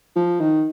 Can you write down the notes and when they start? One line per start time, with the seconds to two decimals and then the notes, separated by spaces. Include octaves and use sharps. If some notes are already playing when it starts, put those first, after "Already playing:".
0.16 F3
0.40 D#3